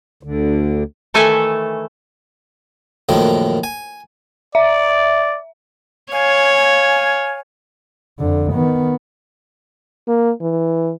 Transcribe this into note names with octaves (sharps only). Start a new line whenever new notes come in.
D2 D3
D#3 E3 A3 A4 E5 G#5
A#1 F#2 D#3 A3
G#5
D5 E5
C#5 F5 G#5
F2 D3
D#3 B3
A#3
E3